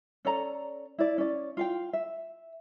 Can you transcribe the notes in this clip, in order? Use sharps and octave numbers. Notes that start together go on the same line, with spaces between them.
C#4 A4 D5 A#5
E4 D5
C#4 D5
F4 F5 G5
E5